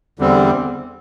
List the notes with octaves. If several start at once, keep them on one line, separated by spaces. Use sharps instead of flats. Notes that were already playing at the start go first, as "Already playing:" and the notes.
E2 D3 G3 C4